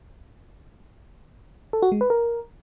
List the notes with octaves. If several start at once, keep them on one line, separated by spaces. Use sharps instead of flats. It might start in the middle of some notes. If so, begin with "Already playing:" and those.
A4
F#4
G#3
B4
A#4